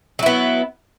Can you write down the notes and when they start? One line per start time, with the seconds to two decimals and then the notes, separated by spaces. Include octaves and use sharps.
0.19 F#3
0.23 E4
0.26 B3